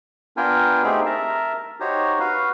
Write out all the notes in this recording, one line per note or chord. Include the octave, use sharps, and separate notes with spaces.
B3 D4 F4 A#4 G5 G#5
A3 C4 D#4 G4 G#4
A#4 E5 A5 A#5
D#4 F#4 G4 C5 C#5 A#5
F#4 B4 F5